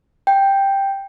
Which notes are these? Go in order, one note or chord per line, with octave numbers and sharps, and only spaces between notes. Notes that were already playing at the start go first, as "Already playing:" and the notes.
G5